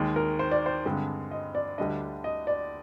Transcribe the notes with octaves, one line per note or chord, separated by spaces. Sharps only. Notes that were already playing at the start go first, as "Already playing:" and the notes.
Already playing: D#2 D#3 G#3
A#4
C5
D5
C5
G2 D3 G#3 C4
D#5
D5
D2 D3 G3 D4 D#5
D#5
D5